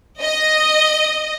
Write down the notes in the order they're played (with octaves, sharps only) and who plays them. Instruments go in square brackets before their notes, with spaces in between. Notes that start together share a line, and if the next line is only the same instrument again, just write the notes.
[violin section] D#5